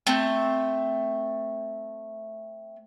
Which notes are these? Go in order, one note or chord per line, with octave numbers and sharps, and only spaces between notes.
A3 C4